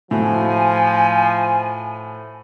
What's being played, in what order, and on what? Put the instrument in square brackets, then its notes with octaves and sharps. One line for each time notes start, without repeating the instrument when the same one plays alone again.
[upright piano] A2 F#4 [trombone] F3 [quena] G#5